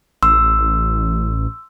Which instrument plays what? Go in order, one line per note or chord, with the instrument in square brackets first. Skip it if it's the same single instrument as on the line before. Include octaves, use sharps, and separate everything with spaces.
[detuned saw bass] A1 [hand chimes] C6 E6